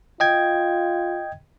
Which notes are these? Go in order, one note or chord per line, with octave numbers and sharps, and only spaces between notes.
F4 D#5 G5 G#6